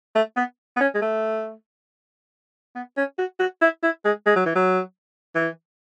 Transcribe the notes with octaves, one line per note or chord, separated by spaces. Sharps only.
A3
B3
B3
C#4
G#3
A3
B3
C#4
F#4
F#4
E4
E4
G#3
G#3
F#3
E3
F#3
E3